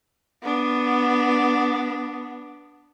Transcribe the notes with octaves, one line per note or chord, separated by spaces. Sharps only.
B3 D4